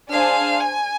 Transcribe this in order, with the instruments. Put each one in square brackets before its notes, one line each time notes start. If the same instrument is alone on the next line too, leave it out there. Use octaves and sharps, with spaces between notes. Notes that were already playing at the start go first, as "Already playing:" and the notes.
[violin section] D4 G#4 C5 G#5 [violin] F5
[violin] G#5